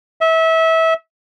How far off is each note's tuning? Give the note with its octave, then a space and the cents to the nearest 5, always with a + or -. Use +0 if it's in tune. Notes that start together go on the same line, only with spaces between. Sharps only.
E5 -25